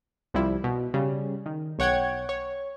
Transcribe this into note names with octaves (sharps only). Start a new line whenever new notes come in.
C2 F3 G3 E4
B2
C#3 G3
D#3
B1 C#5 F#5 G5 G#6
C#5